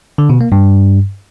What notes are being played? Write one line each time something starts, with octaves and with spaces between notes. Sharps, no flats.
D3
B2
A#3
G2